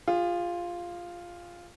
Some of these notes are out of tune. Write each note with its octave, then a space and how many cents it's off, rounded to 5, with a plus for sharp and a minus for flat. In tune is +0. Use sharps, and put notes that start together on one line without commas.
F4 +0 G#4 -40